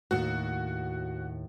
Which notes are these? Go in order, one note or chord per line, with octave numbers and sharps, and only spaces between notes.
D#2 A2 F#4